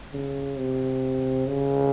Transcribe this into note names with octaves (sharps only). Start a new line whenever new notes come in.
C#3
C3
C#3